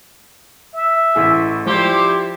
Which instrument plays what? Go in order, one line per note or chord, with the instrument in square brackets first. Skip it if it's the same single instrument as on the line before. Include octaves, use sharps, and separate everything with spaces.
[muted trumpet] E5
[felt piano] A1 A2 G#4
[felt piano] F3 [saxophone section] G3 E4 G4 [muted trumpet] C5